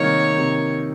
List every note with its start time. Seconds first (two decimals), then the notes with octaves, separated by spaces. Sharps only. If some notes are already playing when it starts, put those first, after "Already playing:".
Already playing: C3 D#3 A#3 D#4 A#4 C#5
0.38 C3